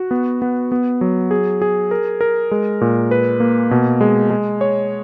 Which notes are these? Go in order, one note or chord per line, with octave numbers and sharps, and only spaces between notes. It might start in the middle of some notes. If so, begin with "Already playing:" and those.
Already playing: F#4
B3
B3
B3
F#3
G#4
G#4
A#4
A#4
G#3
A#2
B4
A#3
B2
G#3
G#3
C#5